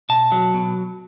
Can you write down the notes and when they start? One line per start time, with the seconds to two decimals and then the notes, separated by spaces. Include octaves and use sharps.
0.09 B2 A5
0.32 F#3
0.54 B2